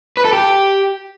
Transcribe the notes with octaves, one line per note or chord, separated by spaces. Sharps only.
B4
A4
G4